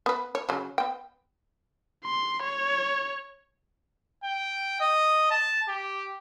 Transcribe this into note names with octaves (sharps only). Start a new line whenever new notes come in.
B3 B4
C#5
C#3 F#3
B3 G5
C6
C#5
G5
D#5
A5
G4